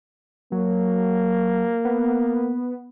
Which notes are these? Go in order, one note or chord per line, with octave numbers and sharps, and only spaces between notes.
F#3 A#3
B3